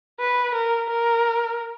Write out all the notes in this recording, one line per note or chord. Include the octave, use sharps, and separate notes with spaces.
B4
A#4
A#4